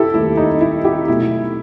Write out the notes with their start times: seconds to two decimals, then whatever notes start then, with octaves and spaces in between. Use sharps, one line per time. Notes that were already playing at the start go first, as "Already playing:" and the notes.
Already playing: E4 G4 A4
0.14 D#2 D#3 A3 E4
0.37 D#4
0.61 E4
0.85 E4 G4
1.08 B2 F#3 A3 E4